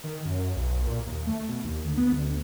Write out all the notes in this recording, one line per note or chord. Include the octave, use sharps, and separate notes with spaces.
D#3
F#2
B1
A#2
D#2
A3
B2
D#2
D2
B3
D2